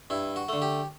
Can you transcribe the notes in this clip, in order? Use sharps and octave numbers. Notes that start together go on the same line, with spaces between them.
G2 E4
F#4
D3 A3
G4